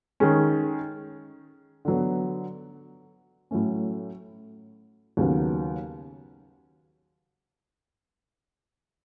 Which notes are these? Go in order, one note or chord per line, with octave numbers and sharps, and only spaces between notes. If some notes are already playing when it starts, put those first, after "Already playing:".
D#3 G#3 C#4
D3 F#3 B3
A2 F#3 A3 C#4
D#2 C#3 F#3 B3